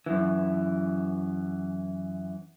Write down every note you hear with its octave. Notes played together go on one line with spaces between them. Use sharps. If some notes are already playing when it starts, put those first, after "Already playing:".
F#2 E3